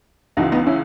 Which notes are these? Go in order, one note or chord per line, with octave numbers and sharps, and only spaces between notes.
C#2 C#3 E3 D#4 F#4
B3 D#4
C#4 E4